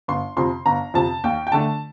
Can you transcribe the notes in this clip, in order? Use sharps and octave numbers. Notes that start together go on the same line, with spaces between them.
G1 C6
F2 C3 C6
G1 A#5
F2 C3 A5
D#2 G5
G5
D3 A3 D4 A5